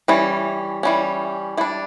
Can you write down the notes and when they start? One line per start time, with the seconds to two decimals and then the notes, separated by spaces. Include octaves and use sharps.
0.08 E3 G3 C#4
0.83 E3 G3 C#4
1.57 G3 D4 E4